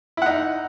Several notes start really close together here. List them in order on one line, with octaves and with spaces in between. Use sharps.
E4 F#5 D#4